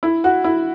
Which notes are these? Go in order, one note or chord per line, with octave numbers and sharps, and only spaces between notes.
E4
F#4
E4